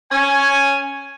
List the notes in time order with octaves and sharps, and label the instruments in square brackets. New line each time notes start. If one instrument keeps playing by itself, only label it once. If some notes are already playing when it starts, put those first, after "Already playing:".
[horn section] C#4 G#5